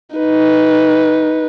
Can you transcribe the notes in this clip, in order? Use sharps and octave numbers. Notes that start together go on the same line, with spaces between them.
D#4 B4